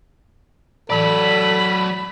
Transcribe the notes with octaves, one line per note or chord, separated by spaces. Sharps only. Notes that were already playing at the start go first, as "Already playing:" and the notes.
A2 E3 F#3 A4 D5 B5